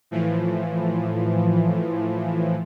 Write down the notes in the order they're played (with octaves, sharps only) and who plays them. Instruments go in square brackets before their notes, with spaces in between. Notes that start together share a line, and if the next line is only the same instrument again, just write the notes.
[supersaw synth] A2 E3 F3